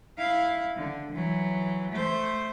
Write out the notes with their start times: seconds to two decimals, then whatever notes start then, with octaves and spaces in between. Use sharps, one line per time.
0.18 E4 F5
0.75 D3
1.12 E3 F#3
1.91 A3 C5